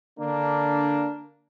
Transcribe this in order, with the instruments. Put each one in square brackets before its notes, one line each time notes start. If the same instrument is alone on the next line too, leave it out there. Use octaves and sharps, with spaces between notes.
[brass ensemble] D3 A#3 D4